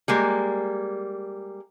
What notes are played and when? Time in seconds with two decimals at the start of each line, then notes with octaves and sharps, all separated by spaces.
0.08 G3 G#3 A#3